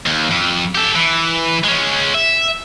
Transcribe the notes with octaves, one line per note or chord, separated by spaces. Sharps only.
D#2
F2
G4 A4
E3
G#3 C#4
E5